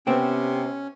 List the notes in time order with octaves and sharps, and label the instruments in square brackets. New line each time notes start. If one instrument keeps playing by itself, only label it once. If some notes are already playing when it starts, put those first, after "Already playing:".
[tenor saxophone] C3 [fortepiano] B3 [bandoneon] C#4 [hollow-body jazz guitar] C5 G5